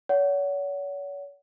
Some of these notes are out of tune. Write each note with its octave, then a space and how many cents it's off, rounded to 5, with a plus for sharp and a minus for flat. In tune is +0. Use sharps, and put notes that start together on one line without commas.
C#5 +40 F#5 +10